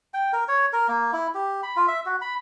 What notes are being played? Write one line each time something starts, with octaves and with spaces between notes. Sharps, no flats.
G5
A#4
C#5
A#4
A#3
E4
G4
B5
F4
E5
F#4
B5